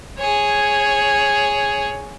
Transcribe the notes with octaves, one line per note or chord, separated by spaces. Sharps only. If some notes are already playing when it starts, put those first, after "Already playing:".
G#4 C#5